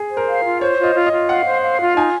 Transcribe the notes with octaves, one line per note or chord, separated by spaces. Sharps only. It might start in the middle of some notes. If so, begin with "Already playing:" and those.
Already playing: G#4
C5
A#4
F5
F4
C5 C#5
F4
D#5
F4
D#5
F4
F5 F#5
C5
F5
F4
D#4 G#5